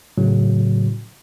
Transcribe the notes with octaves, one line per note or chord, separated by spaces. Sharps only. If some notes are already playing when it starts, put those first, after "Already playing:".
A2 C#3 F#3